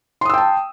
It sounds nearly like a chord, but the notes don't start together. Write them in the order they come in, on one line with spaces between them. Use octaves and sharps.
C6 D#6 E6 G5 A5